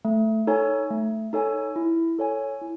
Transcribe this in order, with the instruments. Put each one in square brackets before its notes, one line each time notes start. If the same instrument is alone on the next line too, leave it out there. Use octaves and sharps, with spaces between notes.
[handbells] A3
D#4 A4 C#5 G#5
A3
D#4 A4 C#5 G#5
E4
A4 C#5 G#5
E4